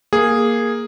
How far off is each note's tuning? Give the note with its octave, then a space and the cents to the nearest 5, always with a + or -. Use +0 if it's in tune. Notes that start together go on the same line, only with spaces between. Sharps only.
A#3 +0 G#4 -5